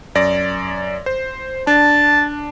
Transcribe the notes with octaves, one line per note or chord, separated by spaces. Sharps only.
F#2 D5 A#6
C5
D4 A5